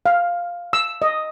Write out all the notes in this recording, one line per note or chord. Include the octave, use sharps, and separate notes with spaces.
F5
E6
D#5